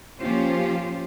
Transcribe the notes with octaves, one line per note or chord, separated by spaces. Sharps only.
F3 A#3 C#4 F4 G4 C5